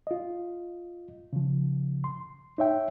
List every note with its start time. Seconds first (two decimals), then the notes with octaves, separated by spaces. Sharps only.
0.07 F4 D#5
1.33 C#3 F3
2.04 C6
2.58 D#4 C#5 E5 G5